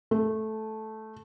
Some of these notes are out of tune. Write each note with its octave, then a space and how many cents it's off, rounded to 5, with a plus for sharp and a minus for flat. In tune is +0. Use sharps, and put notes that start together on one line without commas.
A3 -10